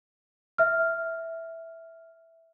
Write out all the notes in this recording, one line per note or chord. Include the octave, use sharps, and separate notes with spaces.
E5 F6